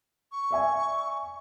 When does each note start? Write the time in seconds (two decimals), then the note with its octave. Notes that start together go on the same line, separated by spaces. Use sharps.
0.32 C#6
0.51 D5 E5 G#5